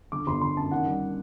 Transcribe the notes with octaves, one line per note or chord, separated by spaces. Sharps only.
D3 D6
G1 C6
G1 C6
F#2 A5
D#3 F#5
G3